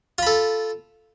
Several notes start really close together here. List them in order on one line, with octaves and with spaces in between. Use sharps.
F4 B5 A4